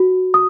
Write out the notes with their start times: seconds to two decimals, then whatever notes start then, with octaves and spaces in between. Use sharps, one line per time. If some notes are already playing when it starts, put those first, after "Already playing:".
Already playing: F#4
0.34 D#6